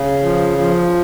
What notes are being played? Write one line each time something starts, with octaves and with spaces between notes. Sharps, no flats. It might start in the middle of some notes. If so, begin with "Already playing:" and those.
Already playing: C#3
F3
F3